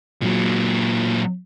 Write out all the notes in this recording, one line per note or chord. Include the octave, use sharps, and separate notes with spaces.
A#2 F#3